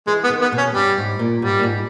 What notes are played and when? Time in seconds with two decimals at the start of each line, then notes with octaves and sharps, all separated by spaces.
0.07 E3 G#3
0.24 B3
0.30 D#3
0.41 B3
0.52 B2
0.58 C#4
0.74 G2 G3
0.98 G#2
1.19 A#2
1.42 G#2 G3
1.59 A#2
1.63 G#2